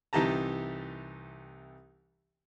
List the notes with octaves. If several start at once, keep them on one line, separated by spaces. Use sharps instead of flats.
C2 E3 D#4 G4 A5 A#5